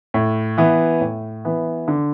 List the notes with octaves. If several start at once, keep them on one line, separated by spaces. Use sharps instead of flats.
A2
E3 B3
A2
E3 B3
D3